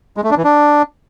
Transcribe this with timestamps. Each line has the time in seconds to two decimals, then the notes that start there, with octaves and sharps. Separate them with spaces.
0.17 G#3
0.24 A3
0.31 D4
0.37 E3
0.44 D4